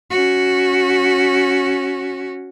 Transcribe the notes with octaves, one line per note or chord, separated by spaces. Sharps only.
C#4 F#4